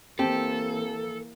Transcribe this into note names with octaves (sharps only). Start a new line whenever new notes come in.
E3 A#3 C4 G4 A4